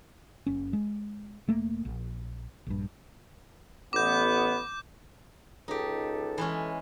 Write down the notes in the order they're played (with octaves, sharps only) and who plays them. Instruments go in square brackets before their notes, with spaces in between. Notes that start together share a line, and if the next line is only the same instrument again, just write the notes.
[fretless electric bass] F#1 C#4
G#3
E1 A3 A#3
A#1
A#1 G2
[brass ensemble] A1 B3 [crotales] D6 G6
[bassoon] C#2 [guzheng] D#4 G4 [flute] A4
[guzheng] E3 G#3 C#4